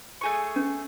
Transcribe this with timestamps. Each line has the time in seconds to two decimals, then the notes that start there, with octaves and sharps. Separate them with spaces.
0.21 A3 G#4 C#6
0.56 C#4